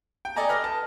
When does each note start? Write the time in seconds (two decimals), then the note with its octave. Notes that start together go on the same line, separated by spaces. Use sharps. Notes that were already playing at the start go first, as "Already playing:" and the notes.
0.25 G5
0.36 A4 D5 D#5 G#5 A#5
0.49 B4 D#5 F6 A#6
0.64 A5